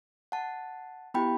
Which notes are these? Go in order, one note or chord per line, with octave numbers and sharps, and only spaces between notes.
F#5 A5
B3 E4 G4 G5 B5